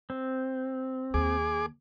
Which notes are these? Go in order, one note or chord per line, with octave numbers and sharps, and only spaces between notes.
C4
D#2 G#4 D6